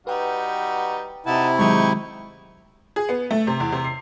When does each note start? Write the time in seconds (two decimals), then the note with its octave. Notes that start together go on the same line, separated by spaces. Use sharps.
0.07 G3 D#4 F#4 B4 G5
1.26 C3 D#4 E4 F#4 A5
1.59 D#3 F#3 G#3 D#4 G5 C#6
2.96 G#4
3.09 B3
3.31 A3
3.47 C3
3.60 E2
3.72 C3
3.85 C7